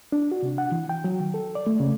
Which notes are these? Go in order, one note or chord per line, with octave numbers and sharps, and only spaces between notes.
D4
F#4
C3
F#5
E3
G5
F#3
D#3
A4
D5
A3
C#3